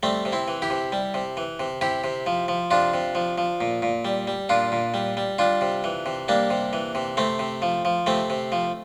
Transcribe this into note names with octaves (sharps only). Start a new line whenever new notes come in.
G3 A3 C4
C3
C4 E4
E3
E4 G4
C3
G3
C3
E3
C3
C3 E4 G4
C3
F3
F3
C3 D4 F4
C3
F3
F3
A#2
A#2
G3
G3
A#2 D4 F4
A#2
G3
G3
G3 D4 F4
C3
E3
C3
G3 A#3 D4
C3
E3
C3
C3 A3 C4
C3
F3
F3
C3 A3 C4
C3
F3